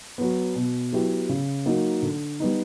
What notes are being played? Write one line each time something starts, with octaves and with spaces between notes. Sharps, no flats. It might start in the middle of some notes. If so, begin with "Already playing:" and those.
F#3 B3
B2
F#3 B3 E4 G4
C#3
F#3 A#3 D#4 F#4
D3
G3 B3 D#4